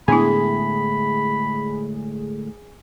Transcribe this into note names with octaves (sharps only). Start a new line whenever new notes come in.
A2 D3 G#3 B3 D4 E4 G#4 B5